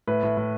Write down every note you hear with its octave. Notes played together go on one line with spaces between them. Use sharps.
A2 B4
A2
A2